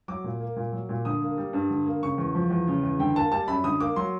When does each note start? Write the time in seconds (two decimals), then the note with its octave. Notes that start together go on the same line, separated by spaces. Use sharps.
0.08 F#3 D6
0.24 A#2
0.40 A#3
0.56 A#2
0.72 F#3
0.89 A#2
1.05 D3 D#6
1.22 A#3
1.37 G3
1.53 G2
1.70 D3
1.86 A#3
2.03 C#3 C#6
2.18 E2
2.35 F3
2.50 E2
2.67 C#3
2.83 E2
2.99 D3 G5
3.15 A#3 A5
3.31 G3 A5
3.48 F#2 B5
3.64 D3 D#6
3.80 A#3 D6
3.96 F#3 C6